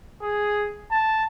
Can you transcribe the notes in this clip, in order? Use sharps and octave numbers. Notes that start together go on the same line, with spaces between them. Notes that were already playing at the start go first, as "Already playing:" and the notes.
G#4
A5